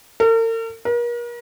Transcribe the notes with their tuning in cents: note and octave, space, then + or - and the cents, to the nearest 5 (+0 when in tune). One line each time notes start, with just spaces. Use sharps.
A#4 -45
A#4 +40